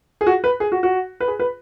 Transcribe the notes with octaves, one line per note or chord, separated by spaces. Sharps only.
G#4
F#4
B4
G#4
F#4
F#4
B4
G#4
B4